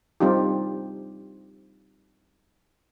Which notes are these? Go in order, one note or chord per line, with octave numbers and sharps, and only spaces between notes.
G3 C4 D#4 F4 G4